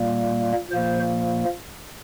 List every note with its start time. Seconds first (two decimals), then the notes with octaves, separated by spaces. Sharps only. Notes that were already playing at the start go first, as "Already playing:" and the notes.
Already playing: A#2 G3 A#3
0.70 A#2 F3 A#3 C5